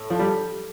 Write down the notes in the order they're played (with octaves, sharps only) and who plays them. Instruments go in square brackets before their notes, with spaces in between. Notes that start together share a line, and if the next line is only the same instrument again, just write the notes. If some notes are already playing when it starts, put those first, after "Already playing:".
Already playing: [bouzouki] A2
[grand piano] F3 [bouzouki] D4
[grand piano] G3